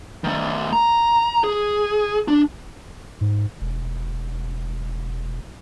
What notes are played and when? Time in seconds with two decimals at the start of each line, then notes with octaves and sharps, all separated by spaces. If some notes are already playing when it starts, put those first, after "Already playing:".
0.24 D#3 A3
0.73 A#5
1.44 G#4
2.28 D4
3.21 G#2
3.61 E1